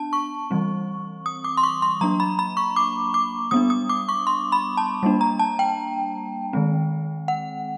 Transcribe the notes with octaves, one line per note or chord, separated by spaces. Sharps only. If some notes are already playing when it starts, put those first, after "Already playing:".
Already playing: B3 D4 A5
C#6
E3 G3 C4
D#6
D6
C6
C#6
C6
F#3 A#3 D4 A#5
B5
B5
C#6
D6
D6
G3 B3 D4 D#6
D#6
D6
C#6
C6
B5
A5
G3 A#3 D4
A#5
A5
G5
D#3 G#3 C4
F#5